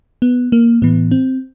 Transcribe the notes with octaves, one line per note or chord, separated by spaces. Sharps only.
B3
A#3
A2 E3 B3
C4